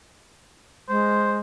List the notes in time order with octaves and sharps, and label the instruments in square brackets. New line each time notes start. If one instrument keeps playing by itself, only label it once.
[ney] G#3 [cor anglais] C5